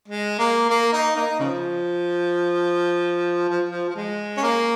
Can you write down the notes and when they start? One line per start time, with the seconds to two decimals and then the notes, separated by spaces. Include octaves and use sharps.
0.08 G#3
0.39 A#3
0.70 A#3
0.93 D#4
1.16 A#3 D#4
1.40 C#3 F3
3.49 F3
3.69 F3
3.89 F3
3.96 G#3
4.37 C#4
4.42 A#3